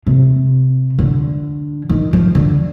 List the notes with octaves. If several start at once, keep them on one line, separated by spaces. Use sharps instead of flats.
C3
D3
D#3
F3
D3